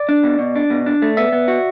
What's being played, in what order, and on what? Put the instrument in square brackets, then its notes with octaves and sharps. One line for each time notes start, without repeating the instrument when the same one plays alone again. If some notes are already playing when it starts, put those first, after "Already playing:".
Already playing: [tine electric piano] D5
[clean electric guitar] D4
B2
B2
D4
B2
D4
A3
[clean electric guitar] B3 [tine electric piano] E5
[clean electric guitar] B3
F#4